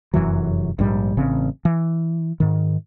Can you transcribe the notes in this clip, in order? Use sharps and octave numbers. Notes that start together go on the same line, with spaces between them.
F1 F#2 E3 F#3
A#1 G#2 G3
A1 C#3 C4
E3
G#2 D#3